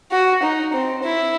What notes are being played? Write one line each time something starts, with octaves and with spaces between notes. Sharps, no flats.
F#4
D#4
C4
E4